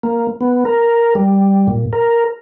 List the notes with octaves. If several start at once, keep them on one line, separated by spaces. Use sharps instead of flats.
A#3
B3
A#4
G3
A#2
A#4